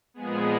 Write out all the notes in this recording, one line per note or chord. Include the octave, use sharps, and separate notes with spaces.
A#2 F3 G#3 B3 G#4